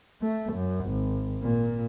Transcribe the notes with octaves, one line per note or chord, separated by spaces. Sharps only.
A3
F#2
G#1
A#2